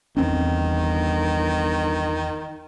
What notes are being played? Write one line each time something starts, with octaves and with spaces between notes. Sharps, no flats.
G1 E2 D#3 C4 C#4